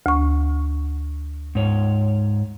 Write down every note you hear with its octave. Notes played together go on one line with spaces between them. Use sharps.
D2 C#6
G#2 C#5